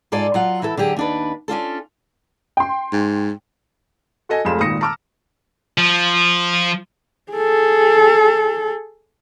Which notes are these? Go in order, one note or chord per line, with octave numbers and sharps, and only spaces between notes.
G#2 F4 A4 D5 G#5
F#3 F4 F#5
E3 E4 A4
D3 F#3 G4 G#4
D#2 D4 B4
C#4 D4 F4 A4
G5 C6
G#2
F#4 A4 D#5 G#5
F1 F2 G#3 F4 E7
G#1 A#2 D#3 D#6 A#6 C#7
A5 A#5 D6 E6 F6
F3
G#4 A4